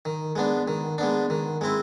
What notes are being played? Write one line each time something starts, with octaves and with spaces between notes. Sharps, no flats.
D#3
G#3 B3 D4
D#3
G#3 B3 D4
D#3
G#3 C4 E4